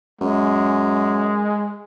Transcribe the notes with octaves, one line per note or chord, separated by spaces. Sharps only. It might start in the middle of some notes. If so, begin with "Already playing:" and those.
F#2 G#3